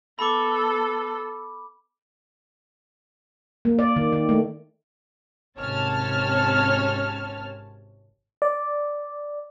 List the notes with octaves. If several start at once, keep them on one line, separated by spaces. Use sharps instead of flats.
B3 A4 B5 D6
A#3
D5
D#3
D#3
A3
G#1 C3 C#4 C#5 A5 F6
D5